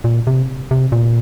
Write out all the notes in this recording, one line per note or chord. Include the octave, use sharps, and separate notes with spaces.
A#2
C3
C3
A#2